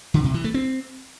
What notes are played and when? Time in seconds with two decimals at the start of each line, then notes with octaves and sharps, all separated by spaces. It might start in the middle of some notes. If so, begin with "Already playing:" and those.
0.14 D3
0.24 C3
0.34 E3
0.44 A3
0.54 C4